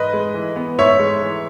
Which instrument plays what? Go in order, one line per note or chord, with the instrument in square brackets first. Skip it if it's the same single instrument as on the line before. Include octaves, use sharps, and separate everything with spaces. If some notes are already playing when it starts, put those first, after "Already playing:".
Already playing: [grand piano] G#2 B4 D#5
G#3
E3
B3
G#2 C#5 E5
G#3
E3